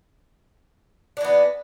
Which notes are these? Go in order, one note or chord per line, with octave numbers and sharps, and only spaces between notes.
E3 B3 D4